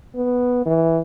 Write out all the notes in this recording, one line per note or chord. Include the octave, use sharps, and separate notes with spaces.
B3
E3